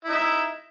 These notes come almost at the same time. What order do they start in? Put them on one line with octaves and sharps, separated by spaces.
E4 D#4 E5